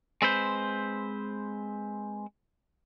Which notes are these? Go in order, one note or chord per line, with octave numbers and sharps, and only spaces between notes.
G#3 C4 B4 C5